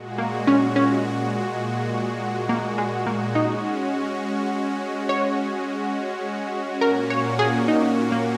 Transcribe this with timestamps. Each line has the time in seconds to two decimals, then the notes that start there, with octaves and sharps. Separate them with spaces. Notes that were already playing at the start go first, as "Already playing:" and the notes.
Already playing: A#2 G#3 F#4
0.18 A#3
0.47 C#4
0.76 C#4
2.49 A#3
2.78 G#3
3.06 A#3
3.35 G#3 C#4 D#4 F#4
5.09 C#5
6.81 A#2 A#3 C#4 F#4 A#4
7.10 C#5
7.39 G#4
7.68 D#4
8.12 A#3